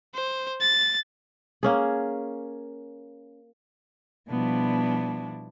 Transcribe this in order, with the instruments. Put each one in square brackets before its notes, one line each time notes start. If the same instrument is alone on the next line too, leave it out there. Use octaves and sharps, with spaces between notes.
[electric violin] C5
A6
[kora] A#3 C#4 G#4
[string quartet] B2 F3 G3 B3 D4 E4